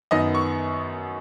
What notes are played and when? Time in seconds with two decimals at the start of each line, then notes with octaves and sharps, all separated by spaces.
0.11 F#2 D#3 B3 D#5
0.35 C#6